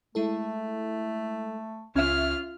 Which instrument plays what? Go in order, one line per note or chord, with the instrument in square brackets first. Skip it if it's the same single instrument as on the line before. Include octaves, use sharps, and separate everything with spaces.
[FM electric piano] G#3 E4 A4 [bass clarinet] A3
[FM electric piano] C#2 G#6 [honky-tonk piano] C#4 E5 [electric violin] F4 F6